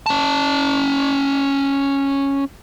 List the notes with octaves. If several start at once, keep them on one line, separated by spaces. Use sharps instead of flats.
C#4 A5